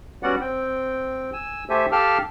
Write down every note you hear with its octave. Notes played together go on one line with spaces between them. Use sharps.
G3 B3 C#4 F#4 D5 F#5
C4 G5
G#5 E6
A3 G4 A4 C5 E5 G#5
G4 A4 F5 G5 A5 F6